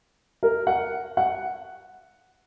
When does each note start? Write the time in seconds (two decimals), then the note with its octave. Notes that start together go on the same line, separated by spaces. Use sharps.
0.43 A#4
0.67 F#5
1.17 F#5